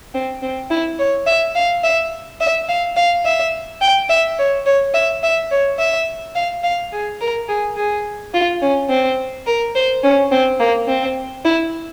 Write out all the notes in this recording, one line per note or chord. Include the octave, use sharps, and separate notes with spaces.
C4
C4
E4
C#5
E5
F5
E5
E5
F5
F5
E5
G5
E5
C#5
C#5
E5
E5
C#5
E5
F5
F5
G#4
A#4
G#4
G#4
F4
C#4
C4
A#4
C5
C#4
C4
A#3
C4
E4